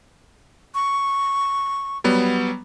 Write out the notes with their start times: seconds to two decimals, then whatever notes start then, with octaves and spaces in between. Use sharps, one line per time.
0.75 C#6
2.04 F#3 G3 B3